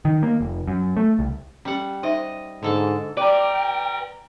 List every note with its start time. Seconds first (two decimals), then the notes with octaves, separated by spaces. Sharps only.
0.05 D#3
0.23 A#3
0.41 F1
0.68 F#2
0.97 A3
1.19 C2
1.65 G3 C#4 G4 F#5
2.03 D#4 C5 D#5 E5
2.63 G#2 D3 A4 A5
3.17 B4 D5 G5 A#5